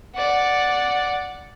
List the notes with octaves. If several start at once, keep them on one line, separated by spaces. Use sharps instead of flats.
D5 F#5